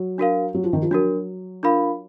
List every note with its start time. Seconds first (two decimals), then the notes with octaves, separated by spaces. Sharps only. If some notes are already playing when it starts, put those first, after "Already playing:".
Already playing: F#3
0.18 D4 F#4 A#4 F5
0.54 F#3
0.64 F3
0.73 D#3
0.82 F3
0.91 F#3 D4 F#4 A#4
1.63 D4 F4 A#4 F5 B5